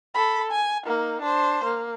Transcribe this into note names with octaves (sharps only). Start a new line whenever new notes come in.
A4 B5
G#5
A#3 D#4
D4 C5
A#3